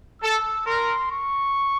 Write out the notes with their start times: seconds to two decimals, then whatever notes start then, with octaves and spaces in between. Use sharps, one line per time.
0.22 A4 E6
0.67 A#4 C6
1.12 C#6